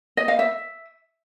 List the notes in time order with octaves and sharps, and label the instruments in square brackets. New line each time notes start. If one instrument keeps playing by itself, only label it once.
[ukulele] D#5
F5
E5